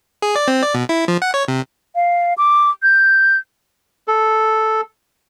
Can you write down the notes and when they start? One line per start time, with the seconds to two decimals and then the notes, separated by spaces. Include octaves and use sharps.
0.22 G#4
0.36 D5
0.48 C4
0.63 D5
0.74 B2
0.89 E4
1.08 F3
1.22 F#5
1.34 C#5
1.48 C3
1.95 F5
2.38 D6
2.83 G6
4.08 A4